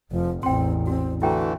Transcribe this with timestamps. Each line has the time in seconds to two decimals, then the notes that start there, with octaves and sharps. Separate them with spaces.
0.11 F1 F3
0.43 A1 E2 C4 G5 C6
0.87 C4 F#4
1.22 D3 E3 A3 E4 F#4 G5 A#5